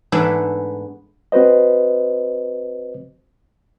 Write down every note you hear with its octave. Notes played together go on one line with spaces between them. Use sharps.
G#2 E3 A3 B3 D4 E4
C4 F#4 B4 C5 D#5